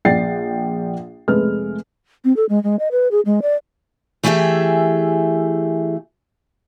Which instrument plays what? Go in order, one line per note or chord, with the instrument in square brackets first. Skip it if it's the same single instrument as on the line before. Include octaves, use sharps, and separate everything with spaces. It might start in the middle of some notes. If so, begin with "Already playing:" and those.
[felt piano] A#1 D5 F#5 G5 A6 C7
F1 G#3 A3 B4 F6
[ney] C4
A4
G#3
G#3
D#5
B4
G#4
G#3
D5
[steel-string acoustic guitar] E3 A3 G4 G#4 E5